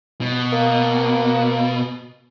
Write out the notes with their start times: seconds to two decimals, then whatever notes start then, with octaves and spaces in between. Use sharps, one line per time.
0.21 B2
0.53 A#3